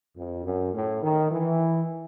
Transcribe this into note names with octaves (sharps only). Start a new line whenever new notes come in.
F2
F#2
A2
D#3
E3